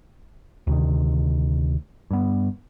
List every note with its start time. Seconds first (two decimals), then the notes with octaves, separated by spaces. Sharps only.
0.67 D2 C3 D#3
2.11 G2 B3